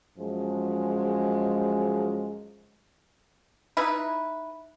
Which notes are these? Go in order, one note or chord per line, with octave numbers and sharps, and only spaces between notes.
F#2 F3 G#3
D#4 E4 B4